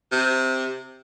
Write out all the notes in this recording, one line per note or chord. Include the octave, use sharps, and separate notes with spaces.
C3